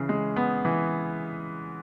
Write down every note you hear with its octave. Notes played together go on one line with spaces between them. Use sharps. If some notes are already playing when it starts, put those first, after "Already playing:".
Already playing: C#3 E3
G#3
B3
E3